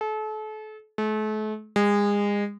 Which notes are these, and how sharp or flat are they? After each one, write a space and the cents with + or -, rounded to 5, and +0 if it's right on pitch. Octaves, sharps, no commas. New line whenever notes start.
A4 -35
A3 -40
G#3 -30